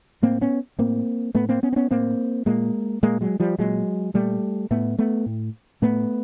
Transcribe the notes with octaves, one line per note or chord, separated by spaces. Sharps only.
A2 A#3 C4
B3 C#4
A2 A#3 C4
A2 A3 B3
A#3 C4
B3 C#4
C4
B3 C#4
A2 A#3 C4
A#2 G#3 A#3
A#2 G#3 A#3
F#3 G#3
F3 G3
A#2 F#3 G#3
A#2 G3 A3
A2 A3 B3
A3 B3
A2
A2 A3 B3